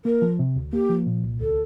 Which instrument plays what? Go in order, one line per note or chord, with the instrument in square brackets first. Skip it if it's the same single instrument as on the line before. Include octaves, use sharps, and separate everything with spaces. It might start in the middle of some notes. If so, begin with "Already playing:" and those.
[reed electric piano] A#3 [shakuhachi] A#4
[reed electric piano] F3
C3
D2
[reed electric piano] A#3 [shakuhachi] G4
[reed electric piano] F3
A#2
C2
[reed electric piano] D2 [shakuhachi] A4